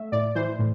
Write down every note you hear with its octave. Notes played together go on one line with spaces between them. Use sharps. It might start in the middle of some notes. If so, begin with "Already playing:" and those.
Already playing: A3 E5
A2 D5
E3 C5
A2